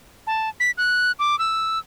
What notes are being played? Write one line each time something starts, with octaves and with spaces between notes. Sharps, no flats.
A5
B6
F#6
D6
E6